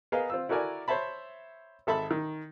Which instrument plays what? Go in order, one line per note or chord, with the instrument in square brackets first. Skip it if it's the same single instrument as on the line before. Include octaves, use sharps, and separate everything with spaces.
[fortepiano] B3 G#4 A#4 D#5 F5
C4 F4 E6
E4 F#4 A4 A#4 D5 G#5
C5 C#5 E5 A5 B5
G#1 A4 E5 A5 B5
D#3